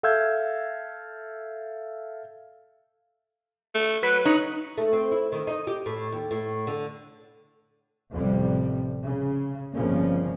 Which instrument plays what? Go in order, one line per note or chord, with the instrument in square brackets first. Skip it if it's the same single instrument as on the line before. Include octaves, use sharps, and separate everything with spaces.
[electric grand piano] A4 E5 F5 E6 G6 G#6
[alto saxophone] A3
[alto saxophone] F#3 [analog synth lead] B4
[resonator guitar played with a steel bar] D#4 [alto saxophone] C#5 [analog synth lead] F#6
[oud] A3
C4
E4
D#3
D#4
G4
A2
D#2
A2
D3
[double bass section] A1 F2 C3 G3
C#3
G1 C#3 F3 A#3 C4 C#4